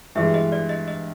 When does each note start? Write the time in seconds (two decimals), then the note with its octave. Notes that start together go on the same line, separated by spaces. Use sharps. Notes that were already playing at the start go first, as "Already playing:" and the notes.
0.15 G2 E3 G#3 E5
0.34 D#5
0.52 D5
0.69 D#5
0.88 D#5